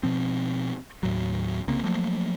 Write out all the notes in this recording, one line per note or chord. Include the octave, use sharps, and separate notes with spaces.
B2 F3 C4
D#2 A2 F#3
C2 C#3 A#3 C4
F3 F#3 A3 A#3